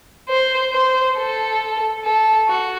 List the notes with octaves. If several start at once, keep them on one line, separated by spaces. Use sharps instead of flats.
C5
C5
A4
A4
F#4